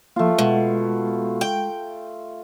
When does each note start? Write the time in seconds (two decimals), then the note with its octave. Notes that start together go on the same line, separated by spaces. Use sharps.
0.16 F3 A3 A#3 F4
0.39 B2 G#3
1.41 G5